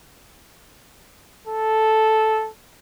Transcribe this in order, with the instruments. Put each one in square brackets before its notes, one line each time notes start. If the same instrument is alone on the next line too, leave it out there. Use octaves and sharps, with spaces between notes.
[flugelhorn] A4